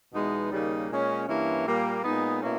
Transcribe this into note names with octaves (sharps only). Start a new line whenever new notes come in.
E2 B2 G#3 B3 D#4
D#2 C#3 G3 A#3 D#4
A#2 G#3 C#4
G2 E3 A#3 C#4 E4
A#2 G3 A#3
A#2 G#3 B3 D#4
B2 A#3 C#4 E4